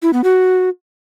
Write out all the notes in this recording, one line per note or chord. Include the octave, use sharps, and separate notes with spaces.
E4
B3
F#4